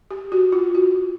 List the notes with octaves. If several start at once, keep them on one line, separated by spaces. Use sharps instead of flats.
G4
F#4
F4
F#4